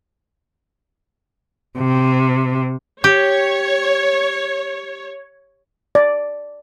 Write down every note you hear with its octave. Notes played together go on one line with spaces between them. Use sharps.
C3
G4 C#5
D5